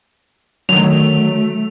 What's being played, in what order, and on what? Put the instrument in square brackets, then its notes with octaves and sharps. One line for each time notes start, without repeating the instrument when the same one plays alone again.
[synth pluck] D3 D#3 [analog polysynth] F#3 [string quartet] A3 [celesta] F7